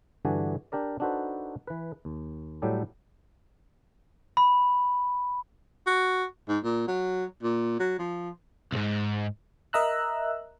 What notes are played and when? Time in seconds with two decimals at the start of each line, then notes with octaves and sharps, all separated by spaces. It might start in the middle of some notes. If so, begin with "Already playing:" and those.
0.25 G2 D3 E3 D4 F#4 G#5
0.72 D4 G4 A#4 D5
1.00 D4 D#4 F#4 A4 B4 C5
1.67 E3 B4
2.05 D#2
2.62 A2 F#3 G3 G4 A4
4.37 B5
5.87 F#4
6.49 G#2
6.64 A#2
6.88 F#3
7.43 A#2
7.79 F#3
7.99 F3
8.72 C2 G#2
9.73 A#4 D#5 E5 A#5 E6 F#6